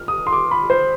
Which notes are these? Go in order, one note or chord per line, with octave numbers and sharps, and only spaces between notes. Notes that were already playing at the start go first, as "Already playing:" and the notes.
Already playing: F6
D#6
C6
D6
B5
C5